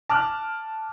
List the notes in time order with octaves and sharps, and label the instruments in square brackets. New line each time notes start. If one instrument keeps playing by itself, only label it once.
[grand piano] A5 D6 F6 F#6